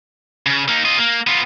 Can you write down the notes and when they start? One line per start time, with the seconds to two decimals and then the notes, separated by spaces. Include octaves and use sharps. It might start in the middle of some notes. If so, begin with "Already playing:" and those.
0.46 C#3
0.68 A#3 D#4
0.85 F4 D#5
0.98 A#3
1.27 B3 F4